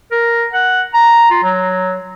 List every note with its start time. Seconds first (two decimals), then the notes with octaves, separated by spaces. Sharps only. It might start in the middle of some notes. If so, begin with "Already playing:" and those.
0.12 A#4
0.53 F#5
0.94 A#5
1.31 F4
1.43 F#3